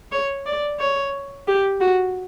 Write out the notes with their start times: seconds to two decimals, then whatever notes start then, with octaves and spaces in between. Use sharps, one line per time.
0.12 C#5
0.46 D5
0.80 C#5
1.48 G4
1.81 F#4